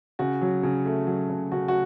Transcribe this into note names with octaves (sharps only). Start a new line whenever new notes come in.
C#3 F#4
F#3
C#3
A3
F#3
C#3
C#3 F#4
F#4